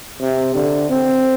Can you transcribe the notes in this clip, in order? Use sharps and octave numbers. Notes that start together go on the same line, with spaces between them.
C3
D3
C4